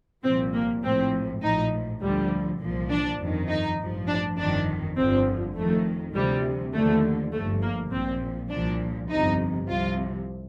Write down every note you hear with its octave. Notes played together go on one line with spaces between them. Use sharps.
C2 A#2 F3 C4
A#3
A#1 A2 F3 C4
A#1 A2 F3 D#4
D2 D3 F3 G3
C2 A#2 F3
D4
G1 F2 D#3
D#4
A1 G2 F3
D4
G1 F2 D#3 D4
G1 F2 D3 F3 C4
F2 D#3 A3
D2 C3 F3 G3
D#2 D3 F3 A3
G1 G2 F3 A3
A#3
A#1 A#2 F3 C4
C2 A#2 F3 D4
G1 F2 C3 D#4
C2 C3 F3 F4